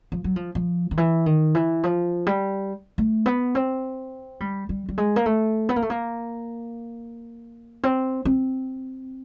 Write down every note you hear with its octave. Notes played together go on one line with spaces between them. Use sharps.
F3
F#3
F3
F3
D#3
E3
D#3
E3
F3
G3
A3
B3
C4
G3
G3
G3
G#3
A#3
A3
B3
A#3
A3
A#3
C4
C4